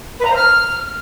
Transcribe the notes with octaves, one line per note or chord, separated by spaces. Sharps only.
B4
A#5
C5
F6